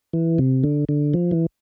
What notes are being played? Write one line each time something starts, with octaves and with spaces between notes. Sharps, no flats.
E3
C3
D3
D3
F3
E3